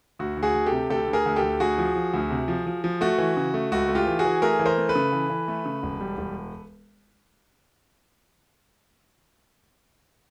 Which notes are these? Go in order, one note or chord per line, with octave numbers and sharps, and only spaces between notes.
D2 F#4
D2
F#4 G#4
D2
G4 A4
C3
D2 G4 A4
D2
G#4 A#4
D2
G4 A4
D2
D2 F#4 G#4
F3
F3
D2
C3
F3
F3
F3
A3 F#4
E3
C#3
A3
C#2 F#4
A3
F4 G4
E3
F#4 G#4
E3
A3 G#4 A#4
E3
A#4 C5
A3
A4 B4
C#3
E3
E3
A3
C#3
E1
G3
E1